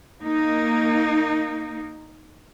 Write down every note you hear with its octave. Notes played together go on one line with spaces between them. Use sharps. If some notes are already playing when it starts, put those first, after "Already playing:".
A#3 D#4